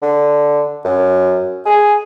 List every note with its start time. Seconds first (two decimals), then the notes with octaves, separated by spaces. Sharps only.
0.02 D3
0.84 F#2
1.66 G#4